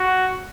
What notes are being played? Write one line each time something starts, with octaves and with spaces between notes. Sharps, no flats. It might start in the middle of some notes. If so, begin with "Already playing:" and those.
Already playing: F#4